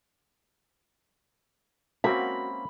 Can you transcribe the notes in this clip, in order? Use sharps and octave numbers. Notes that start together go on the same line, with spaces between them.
A#3 C4 C#4 F#4 B5